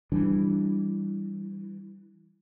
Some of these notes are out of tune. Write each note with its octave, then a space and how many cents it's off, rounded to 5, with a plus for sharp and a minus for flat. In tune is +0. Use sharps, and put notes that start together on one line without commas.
E3 +0 G3 +0 D4 +0